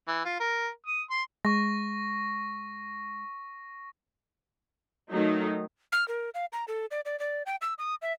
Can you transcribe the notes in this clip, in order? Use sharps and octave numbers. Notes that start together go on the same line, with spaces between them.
E3
F4
A#4
D#6
C6
G#3 C#6 A#6
D#3 F#3 A3 D#4
F6
A#4
F5
A#5
A4
D5
D5
D5
G5
E6
D#6
E5